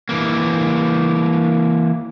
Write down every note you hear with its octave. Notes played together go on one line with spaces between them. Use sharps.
E3 A#3